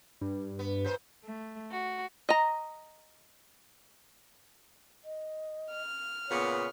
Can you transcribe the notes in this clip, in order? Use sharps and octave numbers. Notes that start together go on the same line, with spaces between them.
G2
B3
A#2 B3 C5
A3
F#4
D#5 A#5
D#5
F6
A#2 C#3 B3 C#5